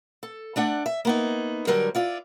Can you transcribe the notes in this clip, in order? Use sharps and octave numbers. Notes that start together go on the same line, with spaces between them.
A4
A3 D4 D5 F#5
E5
A#3 B3 D#4
D3 F#3 G3 A#4
E4 F4 D5